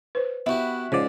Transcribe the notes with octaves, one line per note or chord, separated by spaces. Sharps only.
B4 C5
B3 E4 F#4 G4
G#2 C#3 F3 D5